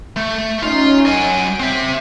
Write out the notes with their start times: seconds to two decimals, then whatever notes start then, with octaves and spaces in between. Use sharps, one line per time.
0.16 A3
0.63 C#4 D#4 F4
1.06 F#3 G#5 D7
1.60 C4 E5